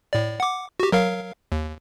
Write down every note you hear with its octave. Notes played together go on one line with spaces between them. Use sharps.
A2 D5
F#5 D6
F#4 G4
F#3 A#4 F5
D#2